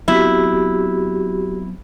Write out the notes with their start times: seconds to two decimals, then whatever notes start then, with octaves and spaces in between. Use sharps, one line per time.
0.08 F#3 B3 C4 E4 F#4 G4